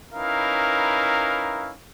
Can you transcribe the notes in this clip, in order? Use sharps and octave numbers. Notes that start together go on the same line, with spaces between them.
C#4 D#4 E4 A#4 B4 F5